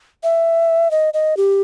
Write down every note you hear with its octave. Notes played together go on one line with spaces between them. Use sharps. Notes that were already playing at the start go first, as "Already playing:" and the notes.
E5
D#5
D#5
G4